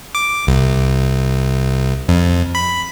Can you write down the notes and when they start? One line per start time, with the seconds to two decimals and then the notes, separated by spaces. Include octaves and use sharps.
0.15 D6
0.47 C2
2.09 F2
2.55 B5